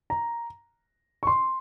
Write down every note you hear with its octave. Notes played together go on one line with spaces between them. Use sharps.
A#5
C#6
C6